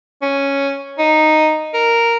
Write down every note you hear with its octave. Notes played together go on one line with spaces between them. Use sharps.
C#4
D#4
A#4